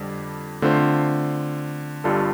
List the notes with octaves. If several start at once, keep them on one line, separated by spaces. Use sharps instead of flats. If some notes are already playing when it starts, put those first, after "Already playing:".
Already playing: F2 D3 G3
D3 A3 C4 F4 C5
G1 G2 G3 F4 A4